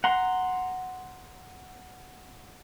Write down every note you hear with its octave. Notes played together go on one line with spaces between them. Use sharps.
F#5 A#5 C6